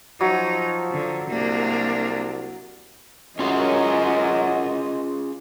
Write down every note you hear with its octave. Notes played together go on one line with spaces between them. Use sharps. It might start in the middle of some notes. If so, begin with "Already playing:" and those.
F3 F#3 D#4
D3
C2 A#3 D4
F#2 C#4 F4 G#4 D#5